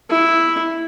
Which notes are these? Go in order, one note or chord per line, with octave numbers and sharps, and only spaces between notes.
E4